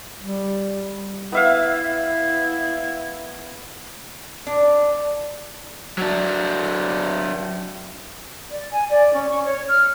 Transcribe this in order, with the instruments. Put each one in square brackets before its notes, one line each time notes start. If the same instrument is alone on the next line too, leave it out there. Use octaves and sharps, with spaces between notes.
[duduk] G3
[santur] B3 E5 F5 [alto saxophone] E4
[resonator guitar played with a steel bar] D4
[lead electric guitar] F#3 D4
[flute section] D5
G#5
D5
C#4
C#6
C#5
F6